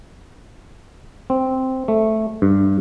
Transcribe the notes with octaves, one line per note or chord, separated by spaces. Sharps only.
C4
A3
G2